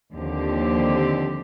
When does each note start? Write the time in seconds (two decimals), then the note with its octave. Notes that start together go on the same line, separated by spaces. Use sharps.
0.14 D#2 D3 F3 C4 G4